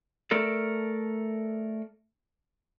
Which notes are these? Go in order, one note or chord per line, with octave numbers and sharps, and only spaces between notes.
A3 A4 A#4 D5